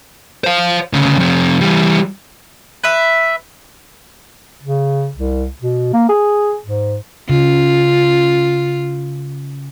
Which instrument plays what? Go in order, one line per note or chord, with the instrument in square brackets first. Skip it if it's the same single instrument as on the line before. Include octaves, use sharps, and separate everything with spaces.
[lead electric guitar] C5 F5
D2 C#3
F2 C3
E3 G3
[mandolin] B4 E5
[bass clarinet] C#3
C2
B2
A#3
G#4
G#2
[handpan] C#3 [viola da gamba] F4